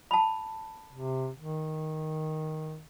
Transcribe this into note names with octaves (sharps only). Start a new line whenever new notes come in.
A5 B5
C3
D#3